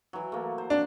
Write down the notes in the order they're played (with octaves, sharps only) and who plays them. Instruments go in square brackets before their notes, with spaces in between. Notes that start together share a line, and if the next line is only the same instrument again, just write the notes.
[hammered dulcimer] E3 F#3
A3 A#3
C5
[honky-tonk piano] D4